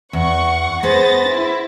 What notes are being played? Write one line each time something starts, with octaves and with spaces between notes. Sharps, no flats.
E2 F#5 C#6
B3 G#4 B4 C5 A6 A#6
E4